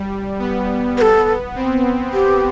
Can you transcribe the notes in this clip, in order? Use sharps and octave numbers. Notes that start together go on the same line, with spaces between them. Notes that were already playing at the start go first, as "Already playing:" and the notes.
Already playing: G3
B3
B4
A4
C4
G4